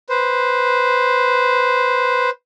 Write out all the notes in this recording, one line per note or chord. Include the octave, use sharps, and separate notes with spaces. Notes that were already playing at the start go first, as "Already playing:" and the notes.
B4 C5